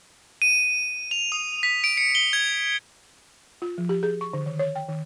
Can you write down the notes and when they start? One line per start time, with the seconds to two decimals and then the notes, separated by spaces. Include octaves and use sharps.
0.42 D#7
1.11 F7
1.32 D#6
1.63 B6
1.84 D7
1.97 C#7
2.15 G7
2.33 G#6
3.62 F4
3.78 F3
3.89 G4
4.03 G#4
4.21 C#6
4.33 D3
4.46 D#3
4.59 C#5
4.76 G5
4.89 D#3